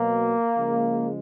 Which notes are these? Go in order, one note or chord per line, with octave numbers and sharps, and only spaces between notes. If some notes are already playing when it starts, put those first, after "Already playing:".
Already playing: B2 F#3 A#3
C#3 F3 G#3